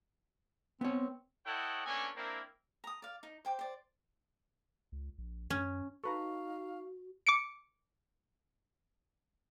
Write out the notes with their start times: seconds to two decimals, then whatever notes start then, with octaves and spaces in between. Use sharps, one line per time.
0.81 B3 C4 C#5
1.46 E4 A4 C#5 D#5 F#5 G5
1.86 A#3 B3 C#4 D4 A4 G#5
2.16 A#3 C4 D4 E4 A#4
2.84 A#5 D#6
3.02 D5 F5
3.23 D#4
3.45 C5 G5 D6
3.59 C5 D5
4.92 C#2
5.18 A#1
5.50 F#2 C#4
6.04 D#4 F#4 A4 B4 F5 A#5 C#6
7.27 D6 C#7 D7